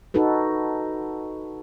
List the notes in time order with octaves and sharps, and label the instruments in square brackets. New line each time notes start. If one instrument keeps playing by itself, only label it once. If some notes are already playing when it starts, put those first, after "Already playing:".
[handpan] D#4 F#4 A4 B4